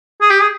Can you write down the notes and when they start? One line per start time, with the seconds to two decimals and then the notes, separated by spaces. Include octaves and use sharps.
0.21 G#4
0.30 G4
0.40 G#4